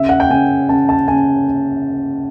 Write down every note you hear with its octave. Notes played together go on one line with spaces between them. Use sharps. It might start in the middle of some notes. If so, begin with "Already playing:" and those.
Already playing: C#3 E5
F#5
G5
C#3 G#5
C#3 A5
A5
C#3 G#5